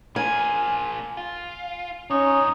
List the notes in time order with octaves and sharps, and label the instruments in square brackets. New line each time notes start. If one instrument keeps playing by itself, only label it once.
[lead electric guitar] F3 A#3 [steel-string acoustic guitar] G#5
[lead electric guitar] F4
[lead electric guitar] G2 C#5 [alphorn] C#4 [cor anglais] D#4